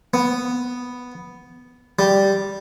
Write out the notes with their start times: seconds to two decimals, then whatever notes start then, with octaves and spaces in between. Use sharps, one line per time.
0.14 B3
1.99 G3